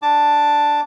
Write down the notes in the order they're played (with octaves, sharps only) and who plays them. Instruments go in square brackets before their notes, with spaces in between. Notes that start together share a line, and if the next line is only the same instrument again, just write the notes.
[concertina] D4 A5 D6